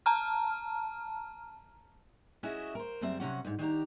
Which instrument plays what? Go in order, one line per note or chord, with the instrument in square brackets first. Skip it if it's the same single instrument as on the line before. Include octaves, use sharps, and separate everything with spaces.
[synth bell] A5 A#5 F6
[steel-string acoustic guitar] C#4 E4 F#4 G#4 D#5 E5
A#4 C5
F#2 C#3 G3 C4 E5
C3 F#3 C#4 F#5
D2 G#2
D#3 D4 G4 A#5